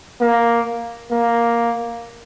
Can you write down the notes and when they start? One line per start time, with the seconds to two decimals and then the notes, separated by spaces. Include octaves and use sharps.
0.21 A#3
1.11 A#3